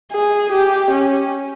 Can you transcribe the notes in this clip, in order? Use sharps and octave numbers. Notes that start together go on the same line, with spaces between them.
G#4
G4
C#4